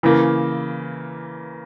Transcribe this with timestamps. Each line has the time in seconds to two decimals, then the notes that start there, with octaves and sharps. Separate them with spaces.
0.03 C#3 E3 A#3